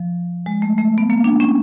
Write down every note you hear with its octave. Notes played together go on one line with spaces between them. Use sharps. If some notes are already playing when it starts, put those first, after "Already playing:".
Already playing: F3
G#3
A3
A3
B3
A#3
D4
C#4